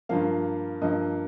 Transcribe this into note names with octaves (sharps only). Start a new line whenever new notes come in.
G2 F3 A#3 F5
G2 F3 A#3 D#5